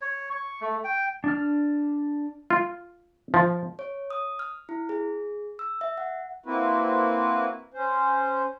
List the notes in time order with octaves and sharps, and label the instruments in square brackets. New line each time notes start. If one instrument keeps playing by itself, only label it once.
[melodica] C#5
C#6
A3
G5
[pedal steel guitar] D4 F6
[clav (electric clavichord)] F4
F3
[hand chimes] C#5
D#6
F6
E4
G#4
E6
E5
F#5
[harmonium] A#3 C4 E4 F#4 B4
C#4 C5